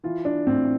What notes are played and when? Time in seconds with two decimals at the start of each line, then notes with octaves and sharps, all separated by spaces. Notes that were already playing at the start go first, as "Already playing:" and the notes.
0.04 E3 F4
0.25 D4
0.47 A2 C4